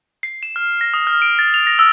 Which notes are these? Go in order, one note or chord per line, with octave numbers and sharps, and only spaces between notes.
C7
E7
F6
A#6
D#6
F6
D7
A6
F7
A#6
E6